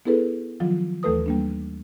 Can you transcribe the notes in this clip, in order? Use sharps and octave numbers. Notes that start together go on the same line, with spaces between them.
B3 E4 G#4 A4 B4
D#3 F3 F#3 F4
D#2 E3 A3 A4 B4 D#6
G3 A#3 D4